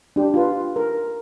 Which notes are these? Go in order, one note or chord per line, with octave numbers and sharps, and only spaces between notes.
D4 G4
F4 B4
A#4